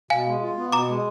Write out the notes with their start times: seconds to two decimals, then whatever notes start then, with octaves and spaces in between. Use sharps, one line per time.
0.10 B2 F5 G#5
0.26 G#3
0.41 F4
0.57 B3
0.72 B2 A#5 D6
0.88 G#3